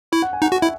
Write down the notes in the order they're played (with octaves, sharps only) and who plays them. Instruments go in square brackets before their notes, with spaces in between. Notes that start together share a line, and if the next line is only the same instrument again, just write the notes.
[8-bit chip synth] E4 [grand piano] C#6
[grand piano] F#5
G#5
[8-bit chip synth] D#4 [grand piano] F#5
[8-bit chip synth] F#4 [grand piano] F#5
[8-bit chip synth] E4 [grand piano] E5